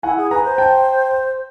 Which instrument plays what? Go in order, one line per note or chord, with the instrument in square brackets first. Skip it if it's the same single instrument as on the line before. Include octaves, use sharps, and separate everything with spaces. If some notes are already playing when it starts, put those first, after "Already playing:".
[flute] E4 [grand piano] F#5 G#5
[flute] G#4
[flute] B4 [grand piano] G#5 A#5
[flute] C5
[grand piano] G5 A5